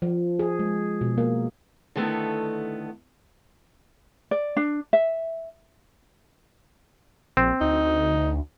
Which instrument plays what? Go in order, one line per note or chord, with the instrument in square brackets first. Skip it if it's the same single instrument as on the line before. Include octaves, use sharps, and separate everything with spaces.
[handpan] F3
G#4
G#3
B2
A#3
[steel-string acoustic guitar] D3 D#3 A3 B3 E4 A4
[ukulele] D5
D4
E5
[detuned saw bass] A#1 [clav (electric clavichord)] C4
[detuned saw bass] D2 [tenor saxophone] D#4